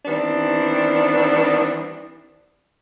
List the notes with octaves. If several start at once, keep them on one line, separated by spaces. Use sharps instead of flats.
D#3 E3 G3 B3 C4 D4